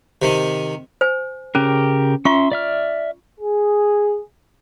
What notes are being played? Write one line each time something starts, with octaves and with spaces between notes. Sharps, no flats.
C3 D#3
C5 G#5
C#3 C#4 G4 A#4
C#4 F4 E5 C6 C#6
D5 E5 F6
G#4